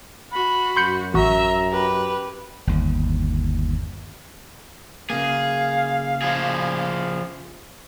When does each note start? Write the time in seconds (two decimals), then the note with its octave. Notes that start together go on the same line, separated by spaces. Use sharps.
0.31 F#4 B5
0.76 F#2 C6 G6 C#7
1.14 A1 F#4 E5 A#5
1.71 G4 B4
2.67 G1 D#2
5.10 C#3 A#3 G#4 F5
6.22 F3 G#4